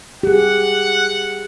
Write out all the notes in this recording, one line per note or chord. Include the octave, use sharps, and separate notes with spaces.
G4 G#4 F#5